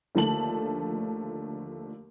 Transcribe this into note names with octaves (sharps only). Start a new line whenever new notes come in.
D#2 D3 F3 A3 A5 F#7